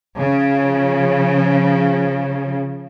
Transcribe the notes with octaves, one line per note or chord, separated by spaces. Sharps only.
C#3 F3